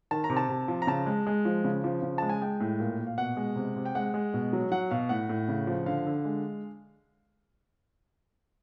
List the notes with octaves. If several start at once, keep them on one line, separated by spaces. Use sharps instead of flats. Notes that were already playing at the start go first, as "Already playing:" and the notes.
D#3 A5
A#5
C3
A5
C3
F3
A#5
C#3 A5
G#3
G#3
F3
C#3
F3
C#3
G#3 A5
G#5
G#3 G5
A2
A#2
A#2
F5
B2 F#5
G#3
C3
C3
G5
G#3 F#5
G#3
B2
F#3
F#3 F#5
B2 F5
A2 F#5
A2
C#3
F3
D3 F5
D3
G#3